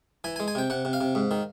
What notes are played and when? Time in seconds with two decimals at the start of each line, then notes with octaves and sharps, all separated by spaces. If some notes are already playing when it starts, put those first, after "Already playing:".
0.24 E3 G#5
0.36 G#5
0.40 G#3
0.48 G#5
0.55 C3 G5
0.70 C3 F#5
0.85 C3
0.93 F5
1.01 C3
1.15 G#2
1.31 D#3